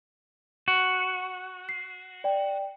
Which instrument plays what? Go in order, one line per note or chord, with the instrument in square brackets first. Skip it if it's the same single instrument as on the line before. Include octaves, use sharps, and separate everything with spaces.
[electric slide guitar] F#4
[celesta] C7
D5 G5